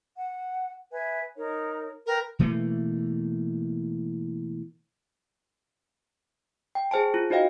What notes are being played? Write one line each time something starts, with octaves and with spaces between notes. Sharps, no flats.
F#5
B4 E5 G#5
D#4 A#4 C#5
A#4 B4 G5 A#5
B2 E3 A3 A#3
G5
G#4 C5 G#5 A5
F4
D#4 F#4 C5 D#5 F5 G5